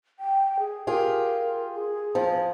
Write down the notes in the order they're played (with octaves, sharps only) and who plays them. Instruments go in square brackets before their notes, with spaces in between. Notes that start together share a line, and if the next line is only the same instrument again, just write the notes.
[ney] G5
G#4
[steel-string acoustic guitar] F4 G4 G#4 [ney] A#4
[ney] G#4
[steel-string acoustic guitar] F2 F3